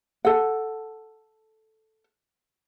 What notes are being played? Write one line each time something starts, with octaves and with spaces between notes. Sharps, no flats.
A4 F#5